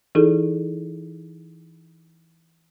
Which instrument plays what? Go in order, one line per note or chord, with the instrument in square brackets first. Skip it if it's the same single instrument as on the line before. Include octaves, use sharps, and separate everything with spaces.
[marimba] E3 D#4 E4 G#4 A4